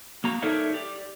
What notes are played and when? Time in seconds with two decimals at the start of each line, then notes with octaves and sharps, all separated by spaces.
0.24 A#3 F#4 A#5
0.42 D#4 A4 A#4 C#5 D5 E5
0.73 G4 D5